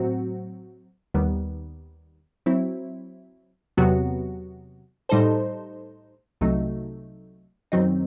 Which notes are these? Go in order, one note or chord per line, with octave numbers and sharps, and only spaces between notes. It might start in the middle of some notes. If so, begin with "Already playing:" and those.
Already playing: A2 F#3 C4 F#4
D#2 D#3 G3 B3
F#3 C4 E4
E2 C3 F#3 B3 F#4
A2 G3 D#4 A4 C5
C2 C3 F#3 A3 D#4
F#2 D#3 F#3 C4 D#4